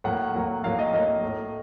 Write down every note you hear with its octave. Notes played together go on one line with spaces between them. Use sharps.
A2 F#3 A#3 F#5
A2 F#3 A#3
A2 F#3 A#3 F5
D#5
A2 F#3 A#3 D#5
A2 A3